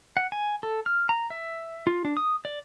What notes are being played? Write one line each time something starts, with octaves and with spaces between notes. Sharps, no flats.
F#5
G#5
A4
F6
A#5
E5
F4
D4
D#6
D5